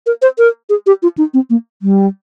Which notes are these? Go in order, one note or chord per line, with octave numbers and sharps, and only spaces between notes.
A#4
C5
A#4
G#4
G4
F4
D#4
C4
A#3
G3